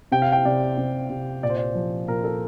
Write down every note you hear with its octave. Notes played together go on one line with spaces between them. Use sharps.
C3 G5
F5
G5
C3 D5
C3
C3
A#2 D5
C5
D5
F3
A#2 A#4
A4